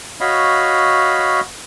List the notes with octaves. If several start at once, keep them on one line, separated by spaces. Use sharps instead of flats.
F#4 C#5 D#5 F5 B5